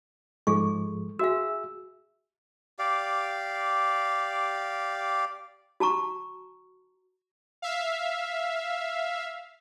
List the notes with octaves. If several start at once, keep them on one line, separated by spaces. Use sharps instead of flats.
G#2 F3 G#3 G#4 A4 C#6
F#4 G#4 E5 F5 E6
G4 D5 F5
F#4 A5 A#5 C#6
E5 F5